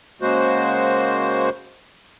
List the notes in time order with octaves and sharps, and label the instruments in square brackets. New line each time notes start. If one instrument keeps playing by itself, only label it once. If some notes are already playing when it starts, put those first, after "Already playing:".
[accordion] C#3 G#3 A#3 F#4 C5